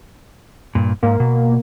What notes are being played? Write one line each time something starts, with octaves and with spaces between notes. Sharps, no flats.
G2 A#2
G#2 A#3
B2